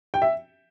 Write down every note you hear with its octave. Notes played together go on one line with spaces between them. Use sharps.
G5
E5